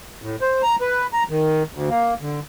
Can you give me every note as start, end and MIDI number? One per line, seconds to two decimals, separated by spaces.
0.22 0.36 45
0.41 0.62 72
0.63 0.76 82
0.81 1.07 71
1.13 1.23 82
1.29 1.63 51
1.73 1.89 38
1.89 2.14 58
2.21 2.40 50